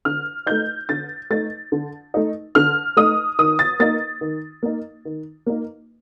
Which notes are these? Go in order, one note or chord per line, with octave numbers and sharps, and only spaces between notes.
D3 F6
A3 D#4 G6
D3 A6
A3 D#4 A6
D3
A3 D#4
D3 F6
A3 D#4 D#6
D#3 D#6
A6
A#3 D#4 A6
D#3
A#3 D#4
D#3
A#3 D#4